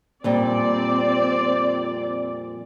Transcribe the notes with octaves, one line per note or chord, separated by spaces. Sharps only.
F2 A#2 G3 C4 D5